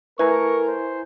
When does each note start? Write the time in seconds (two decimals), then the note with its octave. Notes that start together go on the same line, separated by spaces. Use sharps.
0.19 A3 E4 A#4 B4 G#5 A#5 C#6
0.67 C5